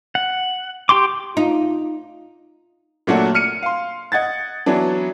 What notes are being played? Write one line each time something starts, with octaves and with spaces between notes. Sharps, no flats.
F#5
G4 G5 C6 D6
D#4 F4
A#2 F#3 A3 D4 F#4
F6 C#7 D#7
F5 C6
D#5 F#5 G#6 A6
E3 F#3 B3 D4